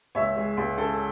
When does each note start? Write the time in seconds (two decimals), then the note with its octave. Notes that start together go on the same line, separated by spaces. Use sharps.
0.15 C#2 C#5 E5
0.36 G#3
0.57 C#2
0.78 C#3 A4